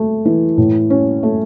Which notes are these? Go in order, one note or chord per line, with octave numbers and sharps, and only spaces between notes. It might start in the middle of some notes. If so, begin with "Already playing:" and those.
Already playing: A3
E3
A2
C#4
A3